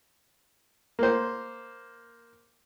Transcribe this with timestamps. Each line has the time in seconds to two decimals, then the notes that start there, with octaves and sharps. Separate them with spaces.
0.99 A#3 C5